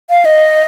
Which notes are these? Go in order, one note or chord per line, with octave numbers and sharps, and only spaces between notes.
F5
D#5